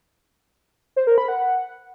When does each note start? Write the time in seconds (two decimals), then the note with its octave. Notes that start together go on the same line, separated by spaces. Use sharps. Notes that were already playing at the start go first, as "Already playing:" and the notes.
0.96 C5
1.07 A#4
1.18 B5
1.28 F#5